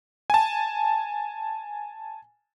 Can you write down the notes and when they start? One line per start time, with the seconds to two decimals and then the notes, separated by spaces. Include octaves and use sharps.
0.30 G#5 A5